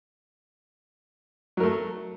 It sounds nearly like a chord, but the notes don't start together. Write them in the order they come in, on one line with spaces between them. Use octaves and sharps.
F#3 A#4 A3